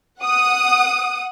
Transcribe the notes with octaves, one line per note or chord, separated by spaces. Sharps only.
F#5 D#6